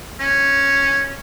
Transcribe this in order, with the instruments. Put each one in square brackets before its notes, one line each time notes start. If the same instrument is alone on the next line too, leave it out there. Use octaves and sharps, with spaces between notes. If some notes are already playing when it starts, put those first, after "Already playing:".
[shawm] C#4